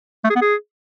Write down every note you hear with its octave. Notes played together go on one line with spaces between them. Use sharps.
A3
G#4
B3
G#4